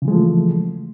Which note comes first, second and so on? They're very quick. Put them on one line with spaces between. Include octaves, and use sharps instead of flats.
C#3 E3 G#3 F3 A3